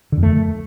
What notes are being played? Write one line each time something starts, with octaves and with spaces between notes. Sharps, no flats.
D3
F2
A3